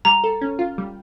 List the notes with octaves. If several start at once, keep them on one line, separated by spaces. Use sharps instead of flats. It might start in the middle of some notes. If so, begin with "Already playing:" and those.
G3 A#5
A4
C#4
F4
G3